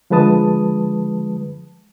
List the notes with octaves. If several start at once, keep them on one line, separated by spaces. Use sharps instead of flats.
D3 F3 G#3 B4 A5 D#6